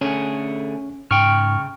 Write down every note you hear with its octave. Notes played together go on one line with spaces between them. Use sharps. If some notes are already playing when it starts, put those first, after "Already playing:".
D3 A3 C#4 G#4
G#2 C#3 G5 C#6 F6